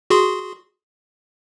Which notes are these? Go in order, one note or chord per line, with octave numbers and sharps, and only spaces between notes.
F#4 G#4 C6